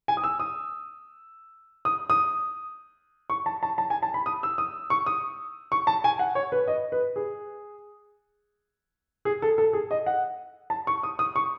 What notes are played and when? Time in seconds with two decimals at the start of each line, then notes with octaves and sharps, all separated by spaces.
0.08 G#5
0.17 D#6
0.24 E6
0.40 D#6
1.85 D#6
2.10 D#6
3.30 C#6
3.46 A5
3.63 A5
3.78 A5
3.90 G#5
4.03 A5
4.14 B5
4.26 D#6
4.43 E6
4.58 D#6
4.90 C#6
5.06 D#6
5.72 C#6
5.87 A5
6.04 G#5
6.19 F#5
6.35 C#5
6.52 B4
6.68 D#5
6.92 B4
7.16 G#4
9.25 G#4
9.42 A4
9.58 A4
9.73 G#4
9.91 D#5
10.06 F#5
10.70 A5
10.87 C#6
11.03 D#6
11.19 D#6
11.36 C#6